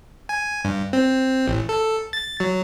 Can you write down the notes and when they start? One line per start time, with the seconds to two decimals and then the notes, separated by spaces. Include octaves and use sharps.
0.29 G#5
0.65 G2
0.93 C4
1.48 A1
1.69 A4
2.13 A6
2.40 F#3